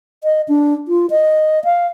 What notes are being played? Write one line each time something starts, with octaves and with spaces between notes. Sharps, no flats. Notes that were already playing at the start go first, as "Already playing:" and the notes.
D#5
D4
F4
D#5
F5